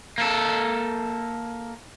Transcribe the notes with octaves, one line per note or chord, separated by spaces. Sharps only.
A#3 A4